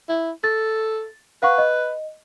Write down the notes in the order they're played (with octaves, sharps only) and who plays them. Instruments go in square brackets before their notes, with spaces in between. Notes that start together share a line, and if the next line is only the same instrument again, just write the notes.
[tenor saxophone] E4
[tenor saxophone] A4 [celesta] A6
[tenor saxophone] B4 [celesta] F5 F#5 C#6
[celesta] D#5